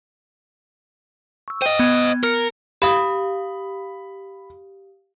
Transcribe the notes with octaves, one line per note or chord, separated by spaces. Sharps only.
C#6 E6
C5 D#5 G5 D#7
B3 G#6
A#4 F6 C#7
G4 F5 B5 D#6